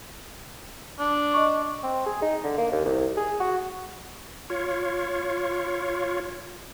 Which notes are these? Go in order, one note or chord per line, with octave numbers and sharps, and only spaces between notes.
D4
D#5 C#6
C4
G#4
D#4
D3
A#3
D#2
C2
G#4
F#4
F4 C#5